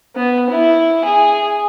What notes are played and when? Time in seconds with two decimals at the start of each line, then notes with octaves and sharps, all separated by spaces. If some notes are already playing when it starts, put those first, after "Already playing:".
0.16 B3
0.50 E4
1.04 G#4